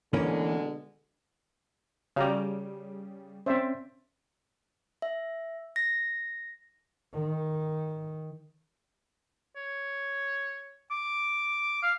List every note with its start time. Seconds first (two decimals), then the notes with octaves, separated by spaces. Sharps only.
0.13 B2 D3 E3 G#3 A#3 C#4
2.16 C#3 G3 C#4 F#4 A#5
3.46 C4 C#4 C5 D5 E5
5.02 E5
5.76 A#6
7.13 D#3
9.56 C#5
10.91 D6
11.83 F5